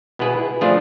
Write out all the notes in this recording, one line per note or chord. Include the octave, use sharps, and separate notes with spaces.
B2 B3 E4 G#4 B4
F3 A3 D4 F4 G#4